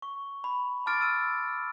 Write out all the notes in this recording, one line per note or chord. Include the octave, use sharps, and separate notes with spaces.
C#6
B5
A5 C6 D6 F6 A6 D7
E6 D#7